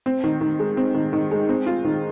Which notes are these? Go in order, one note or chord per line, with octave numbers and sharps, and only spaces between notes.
C4
D#3
D#3
G#3
C4
D#3
D#3
G#3
C4
F4
D#3